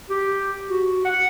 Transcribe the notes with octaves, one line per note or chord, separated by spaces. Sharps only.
G4
F#4
F#5